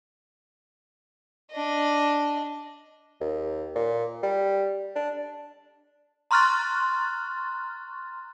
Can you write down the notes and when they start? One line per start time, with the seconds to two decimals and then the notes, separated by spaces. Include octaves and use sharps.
1.52 D4 D#5
3.21 D#2
3.75 A#2
4.23 G3
4.96 D4
6.31 A#5 C6 C#6 F6 F#6 A6